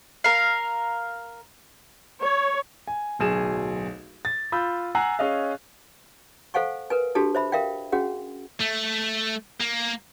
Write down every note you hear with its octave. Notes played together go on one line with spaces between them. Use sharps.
A#4 F5
C#5
G#5
D1 B1 G#4 E7
A6
F4 B5 E6 G6
F#5 G#5 A#5 E6 F#6 C7
C#4 G#4 D#5 F5
A4 C5 F5 F#5 G#5 C#6
A#4 B4 G#5
D4 F#4 G4 A4 A5
C5 E5 B5
A#4 E5 F5 G5
C#4 F#4 G#4 F#5
A3
A#3